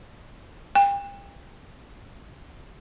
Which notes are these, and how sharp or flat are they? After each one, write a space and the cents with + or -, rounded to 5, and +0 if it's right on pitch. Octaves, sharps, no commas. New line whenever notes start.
G5 +35